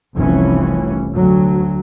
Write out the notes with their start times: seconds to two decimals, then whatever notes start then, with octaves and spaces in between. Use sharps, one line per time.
0.16 F1 C2 E3 C#4
1.13 D2 F#3